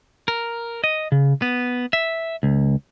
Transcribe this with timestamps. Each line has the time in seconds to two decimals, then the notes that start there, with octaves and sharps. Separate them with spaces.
0.28 A#4
0.84 D#5
1.12 C#3
1.42 B3
1.93 E5
2.43 C#2